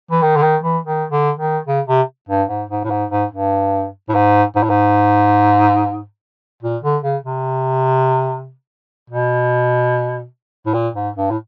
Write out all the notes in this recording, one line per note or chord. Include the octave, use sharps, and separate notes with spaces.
E3
D#3
D3
D#3
E3
D#3
D3
D#3
C#3
C3
G2
G#2
G#2
A2
G#2
G#2
G2
A2
G#2
G#2
A2
G#2
A#2
D3
C#3
C3
B2
A2
A#2
G#2
G2
A2